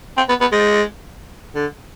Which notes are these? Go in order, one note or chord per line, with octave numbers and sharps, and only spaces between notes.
C4
B3
B3
G#3
D3